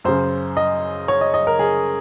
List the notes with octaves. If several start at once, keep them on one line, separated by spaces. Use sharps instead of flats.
F#2 C#3 C5
D#5
C#5
D#5
D#5
A#4
G#4